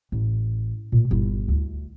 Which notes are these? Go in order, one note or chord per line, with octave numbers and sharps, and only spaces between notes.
A1
A#2
G1 E4
D2